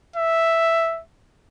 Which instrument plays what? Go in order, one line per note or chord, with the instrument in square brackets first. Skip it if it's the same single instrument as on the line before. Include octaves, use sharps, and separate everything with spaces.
[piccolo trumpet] E5